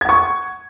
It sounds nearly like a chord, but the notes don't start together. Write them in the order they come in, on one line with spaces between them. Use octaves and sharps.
G#6 F#5 C#6